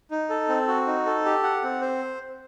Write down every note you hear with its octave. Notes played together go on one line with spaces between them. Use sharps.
D#4
A4
C4
F#4
D#4
A4
G4
F#5
C4
C5